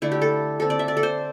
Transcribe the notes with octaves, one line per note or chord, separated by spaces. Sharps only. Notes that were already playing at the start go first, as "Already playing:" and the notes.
D3 A3 D4 E4
G4
A4
D3 C4 A4
D5
E5
D5
A4
C5